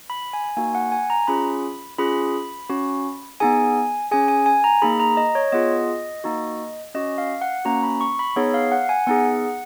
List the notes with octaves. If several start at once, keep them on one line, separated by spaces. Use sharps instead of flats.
B5
G#5
A#3 D#4 F#4 G#5
F#5
G#5
A#5
C#4 F4 G#4 B5
C#4 F4 G#4 B5
C#4 F#4
B3 D#4 G#4 G#5
C#4 G#4 G#5
G#5
G#5
A#5
A#3 D#4 G#4 B5
A#5
D#5
C#5
B3 F4 G#4 D#5
A#3 D#4 F#4
C#4 F#4 D#5
F5
F#5
A#3 C#4 F#4 A#5
B5
C#6
B5
B3 D#4 G#4 C#5
F5
F#5
G#5
B3 D#4 G#4 F#5